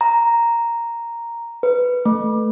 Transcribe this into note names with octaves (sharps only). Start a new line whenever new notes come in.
A#5
B4
A3